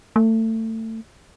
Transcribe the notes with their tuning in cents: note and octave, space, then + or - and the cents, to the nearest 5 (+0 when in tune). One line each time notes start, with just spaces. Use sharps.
A3 +25